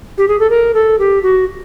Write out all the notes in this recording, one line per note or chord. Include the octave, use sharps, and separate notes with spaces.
G4
G#4
A4
A#4
A4
G4
F#4